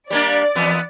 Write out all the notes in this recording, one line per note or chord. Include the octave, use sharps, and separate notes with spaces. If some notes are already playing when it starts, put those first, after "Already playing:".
G3 A#3 D4 D5
E2 B3